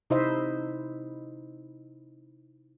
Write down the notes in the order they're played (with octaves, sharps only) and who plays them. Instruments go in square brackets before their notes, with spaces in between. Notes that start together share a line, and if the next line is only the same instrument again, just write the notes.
[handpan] C3 D#4 E4 C5 D#5 E5